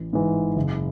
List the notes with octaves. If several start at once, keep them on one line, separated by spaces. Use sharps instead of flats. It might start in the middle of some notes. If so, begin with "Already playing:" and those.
Already playing: A1
G#2 E3
F#1